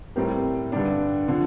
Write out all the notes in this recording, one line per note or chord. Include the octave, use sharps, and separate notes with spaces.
A2 G3 C4 G4 A#4
G2 D3 G3 D4 G4
D3 F3